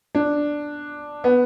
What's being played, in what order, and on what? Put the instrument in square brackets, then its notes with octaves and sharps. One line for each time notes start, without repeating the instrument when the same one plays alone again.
[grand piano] D4
B3